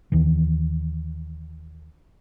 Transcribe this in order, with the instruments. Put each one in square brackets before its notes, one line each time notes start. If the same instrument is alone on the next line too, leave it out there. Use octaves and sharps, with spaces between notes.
[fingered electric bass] D#2 D#3 E3